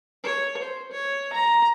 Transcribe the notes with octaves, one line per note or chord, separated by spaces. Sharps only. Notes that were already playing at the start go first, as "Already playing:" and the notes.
C#5
C5
C#5
A#5